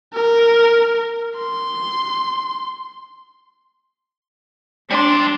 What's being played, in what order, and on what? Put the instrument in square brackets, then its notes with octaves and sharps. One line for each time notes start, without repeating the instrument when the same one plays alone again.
[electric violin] A#4
C6
[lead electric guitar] G3 C6 [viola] D4